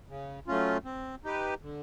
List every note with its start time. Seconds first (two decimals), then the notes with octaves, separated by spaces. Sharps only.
0.09 C#3
0.47 F#3 A3 C#4 F4
0.85 C4
1.24 D#4 G4 B4
1.62 D3